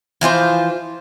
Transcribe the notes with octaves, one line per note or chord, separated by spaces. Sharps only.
E3 F3 F4 C5